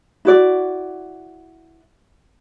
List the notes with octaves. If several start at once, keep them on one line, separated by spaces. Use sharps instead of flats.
E4 F#4 D5